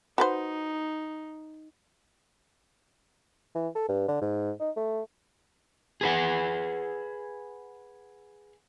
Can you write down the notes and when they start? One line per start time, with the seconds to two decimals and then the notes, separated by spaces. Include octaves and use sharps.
0.18 D#4 F#4 B4 C5
3.55 E3
3.75 A4
3.89 G2
4.08 D3
4.21 G#2
4.60 D#4
4.77 A3
6.01 G#4 B4 F#5